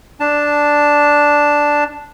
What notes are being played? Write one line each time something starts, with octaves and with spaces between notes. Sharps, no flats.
D4 A5